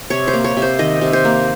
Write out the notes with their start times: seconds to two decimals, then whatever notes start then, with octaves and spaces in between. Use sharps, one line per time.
0.10 C3 C#5
0.28 C5
0.33 A#3
0.44 C#5
0.57 C3
0.62 C5
0.79 D#3 D#5
1.01 C3
1.13 C5
1.25 A#3